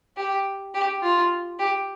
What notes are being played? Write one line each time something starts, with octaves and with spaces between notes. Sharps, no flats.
G4
G4
F4
G4